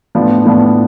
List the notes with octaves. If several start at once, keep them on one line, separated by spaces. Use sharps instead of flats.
A2 F3 B3 D4
A2 F3 B3 D4